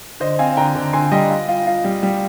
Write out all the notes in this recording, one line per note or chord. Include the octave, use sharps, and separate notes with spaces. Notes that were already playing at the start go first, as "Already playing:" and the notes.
D3 C5 D#5
C4 F5 G#5
D3 G5 A#5
D3
D3 G#5 C6
G3 D#5 G5
F4
F4
F4
G3
G3